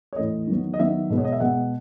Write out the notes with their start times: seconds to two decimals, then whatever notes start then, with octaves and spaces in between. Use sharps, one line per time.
0.13 C#5
0.16 A2 E3 A3 D#5
0.47 D#3 F#3 B3
0.74 D#5
0.79 D#3 F#3 B3 E5
1.10 B2 G#3 B3
1.18 C#5
1.25 D#5
1.32 E5
1.40 B2 G#3 B3 F#5